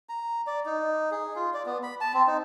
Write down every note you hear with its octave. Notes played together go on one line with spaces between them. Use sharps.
A#5
D5
D#4
G#4
F4
D5
B3
B5
A5
C4
D#4